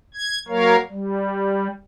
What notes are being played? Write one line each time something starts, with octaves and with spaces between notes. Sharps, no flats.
G#6
F#3 A#3 A#4 C#5 F5
G3